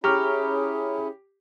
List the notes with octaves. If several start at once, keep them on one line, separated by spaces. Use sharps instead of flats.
C#4 E4 G4 G#4 A#5 C#6 F6